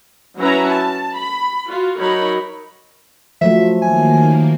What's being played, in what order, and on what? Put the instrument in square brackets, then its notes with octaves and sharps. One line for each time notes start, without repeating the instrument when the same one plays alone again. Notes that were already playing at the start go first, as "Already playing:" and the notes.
[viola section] F#3 C#4 E4 B4 E5 A#5
A5
B5
F4 F#4
F#3 D#4 A#4 C#5 B5
[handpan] F3 F#3 A3 [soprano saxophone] E5
[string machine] D#3 A#3 [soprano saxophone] G#5